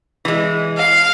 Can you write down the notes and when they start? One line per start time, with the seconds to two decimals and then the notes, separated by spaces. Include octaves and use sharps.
0.25 E3 G#3
0.78 F5